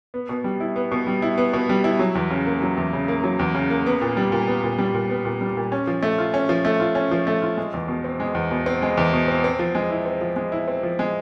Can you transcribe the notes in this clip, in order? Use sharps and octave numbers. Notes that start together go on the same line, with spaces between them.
B3
B2
G3
E4
B3
B2
G3
E4
B3
B2
G3
E4
F#3
E2
C#3
A#3
F#3
E2
C#3
A#3
F#3
E2
C#3
A#3
B3
A#2
G3
A#2
B3
A#2
G3
A#2
B3
A#2
G3
A#2
C#4
F3
A3
F4
C#4
F3
A3
F4
C#4
F3
A3
F4
G#3
E2
B2
C4
G#3
E2
B2
C4
G#3
E2
B2
C4
C4
F3
G#3
E4
C4
F3
G#3
E4
C4
F3
G#3